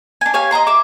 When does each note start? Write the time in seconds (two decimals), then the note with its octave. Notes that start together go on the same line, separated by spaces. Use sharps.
0.21 D4 G#5
0.34 G4 C#5 F5 G#5
0.51 D#5 G#5 A#5 C6
0.67 E5 D6